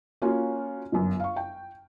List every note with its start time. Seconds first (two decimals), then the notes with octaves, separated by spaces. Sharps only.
0.22 A#3 C#4 F4 F#4
0.92 G1 F#2
1.20 F5 C#6
1.36 G5